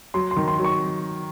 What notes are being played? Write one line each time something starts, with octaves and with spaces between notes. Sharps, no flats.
F#3 C6
C6
D#3
C6
F#3
C#6